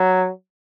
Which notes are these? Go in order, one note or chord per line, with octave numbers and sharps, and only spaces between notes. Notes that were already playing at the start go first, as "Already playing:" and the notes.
Already playing: F#3